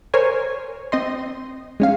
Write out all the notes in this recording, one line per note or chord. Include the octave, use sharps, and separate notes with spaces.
A#4 C5 C#5 G#5
C4 D#5 C6
G#3 C#4 F5